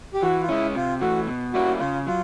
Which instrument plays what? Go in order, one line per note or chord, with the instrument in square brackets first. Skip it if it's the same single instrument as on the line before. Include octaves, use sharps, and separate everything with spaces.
[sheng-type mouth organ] G4
[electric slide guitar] E3 [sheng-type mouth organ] F#4
[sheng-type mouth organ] F4
[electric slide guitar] G#3 C#4 [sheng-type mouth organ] E4
[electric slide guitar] C3 [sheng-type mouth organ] F4
[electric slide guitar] E3 A3 [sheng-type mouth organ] F#4
[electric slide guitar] B2
[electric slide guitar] G3 A#3 C#4 E4 [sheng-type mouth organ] F#4
[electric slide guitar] C#3 [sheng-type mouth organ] F4
[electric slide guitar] F#3 [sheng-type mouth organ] F4